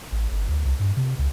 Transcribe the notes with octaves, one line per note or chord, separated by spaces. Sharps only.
A1
G1
D2
C2
G2
C3
C#2